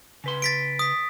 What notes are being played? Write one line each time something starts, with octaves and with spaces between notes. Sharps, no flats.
C#3 B4 C6
A6 B6 D7
D#6 B6